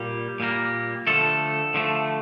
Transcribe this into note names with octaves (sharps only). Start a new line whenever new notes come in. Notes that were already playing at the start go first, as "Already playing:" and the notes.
Already playing: A#2 G3 A#3 G4
A#2 G3 A#3
D3 F3 A3 A4
D3 F3 A3